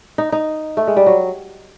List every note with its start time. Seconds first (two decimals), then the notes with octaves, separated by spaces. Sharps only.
0.18 D#4
0.32 D#4
0.77 A3
0.87 G#3
0.97 G3
1.07 F#3